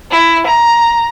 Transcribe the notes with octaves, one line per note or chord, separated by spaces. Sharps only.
E4
A#5